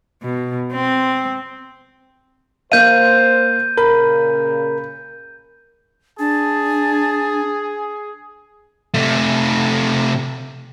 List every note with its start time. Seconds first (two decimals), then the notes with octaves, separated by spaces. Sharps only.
0.23 B2
0.73 C4
2.72 A#3 C5 F5 G6 D#7
3.78 A#2 C#3 A#4 B5
6.19 D4 G#4 A5
8.94 C3 A3